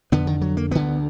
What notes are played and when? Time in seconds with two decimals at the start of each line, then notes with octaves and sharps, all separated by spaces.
0.12 F2 D3 B3
0.27 D#3
0.41 F#3
0.57 A#3
0.71 D2 D3 B3